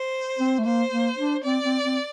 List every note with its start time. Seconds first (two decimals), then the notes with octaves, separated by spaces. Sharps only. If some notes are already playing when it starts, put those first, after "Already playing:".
Already playing: C5
0.39 C4
0.59 A3
0.65 A#3 C5
0.91 A#3
1.18 D4
1.44 C4 D5
1.64 C4
1.84 C4